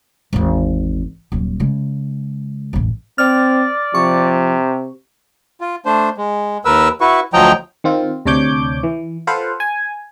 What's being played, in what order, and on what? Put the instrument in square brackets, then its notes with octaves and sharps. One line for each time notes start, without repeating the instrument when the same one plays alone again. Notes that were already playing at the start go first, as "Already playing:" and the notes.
[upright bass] G#1 E2
D#1 F#3
C#3 G#3
E1 A1
[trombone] C4 [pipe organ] D5 [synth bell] F6
[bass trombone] C3 [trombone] F3 [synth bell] C#6
[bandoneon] F4
A3 D4 C5
G#3
D#2 A#4 B4 E6
E4 F#4 B4 C#6
D2 F3 F#3 D#5 G5 A#5
[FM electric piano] D#3 C4 F4
D2 C3 D4 C#5 D6 G6
E3
F4 A4 B4 C5 F5 F#5
G#5